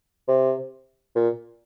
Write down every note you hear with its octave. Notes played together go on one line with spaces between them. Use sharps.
C3
A#2